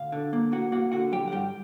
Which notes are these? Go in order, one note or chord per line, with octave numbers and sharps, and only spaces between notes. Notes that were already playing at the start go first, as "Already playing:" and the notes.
Already playing: D2 F5
D3
A#3
A#3 F#4 F#5
A#3 F#4 F#5
D3 F#4 F#5
F#3 G4 G5
F#5
G2 G4 G5